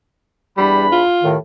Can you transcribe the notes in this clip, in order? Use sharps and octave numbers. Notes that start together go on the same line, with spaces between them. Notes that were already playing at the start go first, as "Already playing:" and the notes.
E2 G3 D4 B5
F4
A2 C3 D#3